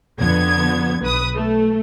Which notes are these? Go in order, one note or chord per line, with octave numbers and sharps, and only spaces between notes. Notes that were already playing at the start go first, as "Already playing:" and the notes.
F2 D3 B3 G#6
B1 B4 D#6
A3